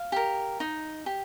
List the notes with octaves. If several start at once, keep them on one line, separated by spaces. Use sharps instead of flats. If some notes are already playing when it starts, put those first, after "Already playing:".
Already playing: F5
G4 A#4
D#4
G4